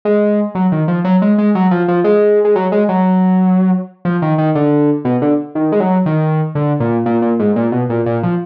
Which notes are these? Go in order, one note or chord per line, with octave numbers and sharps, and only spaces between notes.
G#3
F#3
D#3
F3
F#3
G#3
G#3
F#3
F3
F3
G#3
G#3
F#3
G#3
F#3
F3
D#3
D#3
D3
B2
D3
D#3
G#3
F#3
D#3
D3
A#2
A#2
A#2
G#2
A#2
B2
A#2
A#2
F3